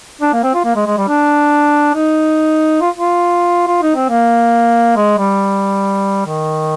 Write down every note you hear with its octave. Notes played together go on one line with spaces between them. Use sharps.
D4
A#3
C4
F4
A#3
G#3
G#3
G3
D4
D#4
F4
F4
F4
D#4
C4
A#3
G#3
G3
D#3